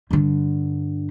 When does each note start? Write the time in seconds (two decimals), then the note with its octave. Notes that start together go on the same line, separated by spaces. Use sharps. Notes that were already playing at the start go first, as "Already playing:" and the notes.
0.11 G2 D3